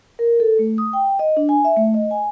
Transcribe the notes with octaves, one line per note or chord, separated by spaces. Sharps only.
A#4
A4
A3
D#6
G5
D#5
D4
G#5
E5
A3
D#5
G#5